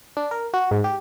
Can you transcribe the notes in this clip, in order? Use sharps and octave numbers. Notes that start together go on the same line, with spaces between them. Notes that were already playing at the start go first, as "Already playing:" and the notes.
D4
A#4
F#4
G#2
G4